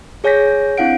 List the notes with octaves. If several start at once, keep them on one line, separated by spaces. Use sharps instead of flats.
G#4 C#5 G#5 G6 A#6 B6
C4 D4 E4 F5 F#5 D7